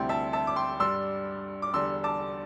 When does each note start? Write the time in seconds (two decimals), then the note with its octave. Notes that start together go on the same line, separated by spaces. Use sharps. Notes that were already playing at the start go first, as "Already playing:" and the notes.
Already playing: D2 C3 G3 C4 E4 G5 C6
0.09 E5 A5
0.33 E5 A5
0.47 D6
0.56 G5 C6
0.80 G2 G3 D4 C6 E6
1.62 D6
1.74 E2 D3 G3 C6 E6
2.04 A5 D6